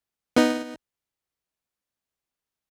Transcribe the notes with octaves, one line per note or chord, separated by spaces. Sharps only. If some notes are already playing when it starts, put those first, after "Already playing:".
B3 D#4